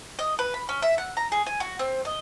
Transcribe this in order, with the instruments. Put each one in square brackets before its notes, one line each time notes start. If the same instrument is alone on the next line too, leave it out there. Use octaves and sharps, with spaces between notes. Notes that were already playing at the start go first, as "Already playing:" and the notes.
[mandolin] D#5
B4
B5
C#4
E5
F#5
A#5
G#4
G#5
F#4
C4
D#5